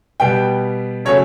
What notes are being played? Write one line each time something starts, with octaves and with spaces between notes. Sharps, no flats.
B2 G3 B3 G5
C#3 F#3 A3 C#5